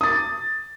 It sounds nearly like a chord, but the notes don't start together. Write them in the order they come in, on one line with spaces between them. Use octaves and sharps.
D#6 A6 D6